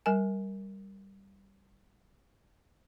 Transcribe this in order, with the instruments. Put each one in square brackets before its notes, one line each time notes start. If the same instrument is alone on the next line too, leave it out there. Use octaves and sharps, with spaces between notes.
[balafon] G3 A#4 G#5